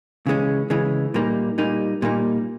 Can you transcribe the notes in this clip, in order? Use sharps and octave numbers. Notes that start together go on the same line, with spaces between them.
C#3 E3 G#3 C#4
C#3 E3 G#3 C#4
A#2 G3 A#3 D#4
A#2 G3 A#3 D#4
A#2 G3 A#3 D#4